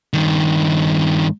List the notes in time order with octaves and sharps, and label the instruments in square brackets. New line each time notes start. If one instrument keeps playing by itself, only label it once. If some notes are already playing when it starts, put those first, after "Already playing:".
[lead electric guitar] G2 D#3